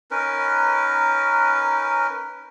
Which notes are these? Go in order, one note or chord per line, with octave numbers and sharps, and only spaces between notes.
C#4 D#4 A#4 B4